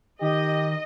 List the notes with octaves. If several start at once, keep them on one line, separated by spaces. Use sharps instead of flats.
D#3 G4 D#5